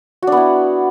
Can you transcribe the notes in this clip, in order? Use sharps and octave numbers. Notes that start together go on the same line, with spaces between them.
B3 D4 E4 F#4